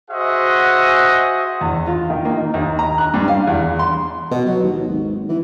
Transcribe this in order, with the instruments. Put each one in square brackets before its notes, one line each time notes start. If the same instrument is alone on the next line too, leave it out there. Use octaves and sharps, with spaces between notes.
[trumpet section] F#4 G#4 C5 D#5 E5 F#5
[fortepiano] E2
F4
D#3
A#3
D#4
D#2
A#5
F#6
G2
F5
E2
C6
[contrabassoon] B2
F#3
D#2
G#1
E3